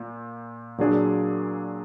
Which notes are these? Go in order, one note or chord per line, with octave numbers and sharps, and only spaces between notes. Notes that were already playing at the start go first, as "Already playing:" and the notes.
Already playing: A#2
A#2 F#3 D4 G#4 D5